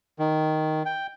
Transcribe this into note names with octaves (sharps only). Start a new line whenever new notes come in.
D#3
G5